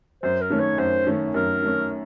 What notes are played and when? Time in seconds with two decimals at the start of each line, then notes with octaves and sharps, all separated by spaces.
0.23 F#2 C5
0.41 A#4
0.50 D#3 A3 C#4
0.60 C#5
0.78 F#2 C5
1.07 D#3 A3 C#4
1.34 F#2 A#4
1.62 D#3 A3 C#4